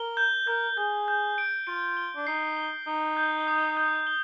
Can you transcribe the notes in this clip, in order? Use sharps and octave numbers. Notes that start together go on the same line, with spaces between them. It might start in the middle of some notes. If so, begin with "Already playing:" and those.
Already playing: A#4 G7
G6
A#4 G6
G#4 G6
G6
D7
F4 D7
G7
D4
D#4 C7
G7
D#4 G7
G6
D#6
G6
G7